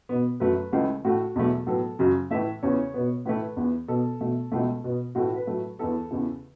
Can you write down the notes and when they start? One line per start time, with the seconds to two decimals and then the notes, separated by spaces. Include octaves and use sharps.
0.09 B2 B3
0.40 F#2 F#3 A3 B4
0.72 C#2 C#3 E3 A3
1.05 A2 A3 F#4
1.36 E2 B2 F#3 A3
1.67 A2 F#3 B3 A4
1.99 F#2 C#3 F#3
2.31 A2 E3 A3 E5
2.63 E2 C#3 E3 C#5
2.94 B2 B3
3.26 A2 E3 A3 B4
3.57 E2 E3 B3
3.88 B2 B3 A4
4.21 B2 A3
4.52 C#2 B2 A3
4.84 B2 B3
5.15 A2 E3 A3 F#4
5.27 F#4
5.36 B4
5.47 A2 F#3 A3
5.79 E2 E3 B3 A4
6.11 E2 C#3 E3